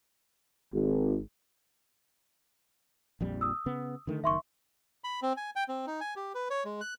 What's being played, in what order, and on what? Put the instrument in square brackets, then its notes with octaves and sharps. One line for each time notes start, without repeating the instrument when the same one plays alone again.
[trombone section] G#1
[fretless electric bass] A#1 F2 G3
[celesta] D#6 E6
[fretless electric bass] C#3 B3
D3 D#3 A3
[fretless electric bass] F#1 D#3 [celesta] E5 C6 C#6
[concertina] B5
C4
G#5
G5
C4
D#4
G#5
G4
B4
C#5
G#3
F#6